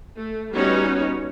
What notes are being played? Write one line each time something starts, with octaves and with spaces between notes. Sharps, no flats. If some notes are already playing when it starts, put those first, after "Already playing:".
A3
G3 B3 C#4 D#4 F#4 C#5